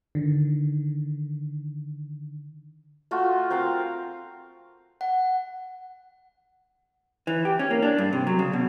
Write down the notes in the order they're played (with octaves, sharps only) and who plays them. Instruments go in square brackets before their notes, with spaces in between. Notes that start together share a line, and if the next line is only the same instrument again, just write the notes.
[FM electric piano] D3 D#3
[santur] A3 F4 F#4
C4 A#4 F5
[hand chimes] F#5
[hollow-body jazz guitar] E3
G4
C#4
A#3
D4
G2
C3
F#3
C#3
B2